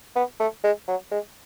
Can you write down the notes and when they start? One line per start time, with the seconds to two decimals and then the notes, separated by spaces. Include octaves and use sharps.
0.16 B3
0.40 A3
0.64 G#3
0.88 F#3
1.11 G#3